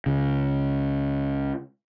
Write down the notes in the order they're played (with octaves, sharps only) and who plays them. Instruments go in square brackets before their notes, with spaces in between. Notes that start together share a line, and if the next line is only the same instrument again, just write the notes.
[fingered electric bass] C#2 C#3